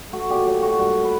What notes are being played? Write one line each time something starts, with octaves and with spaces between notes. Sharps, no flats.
A3 F#4
A#2 G4
F#3 G4
A3 F#4
G2 F#4
B4